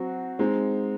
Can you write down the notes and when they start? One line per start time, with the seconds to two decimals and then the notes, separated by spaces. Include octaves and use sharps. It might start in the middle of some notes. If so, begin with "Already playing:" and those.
Already playing: F#3 C4 F#4
0.39 G#3 C4 D#4